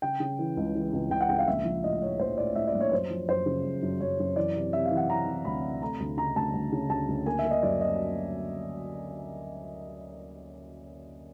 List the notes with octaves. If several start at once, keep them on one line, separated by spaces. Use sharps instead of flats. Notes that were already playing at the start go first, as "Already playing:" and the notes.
C#3 G5
C#3
E3
C#2
E3
C#2
C#2 G5
F#5
C#2 G5
F5
A#1 E5
F3
A2 D#5
A2 C#5
A#1 C5
A2 D5
A2 E5
D5
A#1
C#5
F#2 C5
F3
F#2 C5
C#3
F#2
F#2
F#2 C#5
F#2
E3 D5
C3
C3 E5
F5
E3
F#5
E3 A#5
E3
D2 B5
C3
A3 A#5
D2
C#3 A#5
D2 A5
D2
C#3
D2 A5
D2
A#3 G#5
E5
A#3
D#5
F#2 D5
G3 D#5